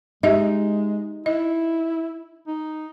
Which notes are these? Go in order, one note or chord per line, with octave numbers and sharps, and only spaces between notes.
G#3 D#4 G4 D#5 E5
E4 D#5
D#4